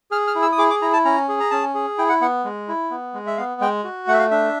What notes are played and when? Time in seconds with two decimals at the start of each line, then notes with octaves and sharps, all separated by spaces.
0.11 G#4 F6
0.27 F6
0.35 E4
0.42 E6
0.52 D#6
0.58 G#4 D6
0.70 D6
0.82 E4 A#5
0.93 A5
1.05 C#4 A#5
1.29 G#4
1.40 A#5
1.51 C#4 A5
1.75 G#4
1.98 E4 G5
2.09 F#5
2.21 B3 F#5
2.45 G#3
2.68 E4
2.91 B3
3.14 G#3
3.27 E5
3.38 B3 F5
3.61 G#3 G5
3.84 F#4
4.07 A3 F#5
4.13 E5
4.19 F5
4.31 D4 E5